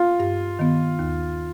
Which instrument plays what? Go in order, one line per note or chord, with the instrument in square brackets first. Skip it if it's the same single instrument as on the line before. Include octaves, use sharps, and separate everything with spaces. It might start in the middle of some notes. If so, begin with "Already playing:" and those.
Already playing: [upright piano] F4
[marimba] G2
D#3 B3
D#2